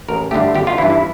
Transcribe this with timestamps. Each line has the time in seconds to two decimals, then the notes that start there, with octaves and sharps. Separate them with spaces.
0.08 A1 A#4
0.31 G2 D3 A3 G4
0.55 G1 G4
0.67 F4
0.78 E3 E4
0.82 G2
0.90 E4